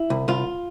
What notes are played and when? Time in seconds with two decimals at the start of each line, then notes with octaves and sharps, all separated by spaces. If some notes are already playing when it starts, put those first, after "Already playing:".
Already playing: E4
0.10 C2
0.28 C2 F4